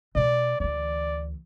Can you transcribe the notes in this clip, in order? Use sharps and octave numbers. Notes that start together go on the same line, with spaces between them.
B2 G#3 D5
D2 E3 D5